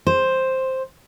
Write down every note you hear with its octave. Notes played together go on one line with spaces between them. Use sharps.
C5